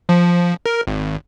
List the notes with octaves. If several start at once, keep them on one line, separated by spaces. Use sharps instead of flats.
F3
A#4
G#1